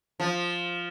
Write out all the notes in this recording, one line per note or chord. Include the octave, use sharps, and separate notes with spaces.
F3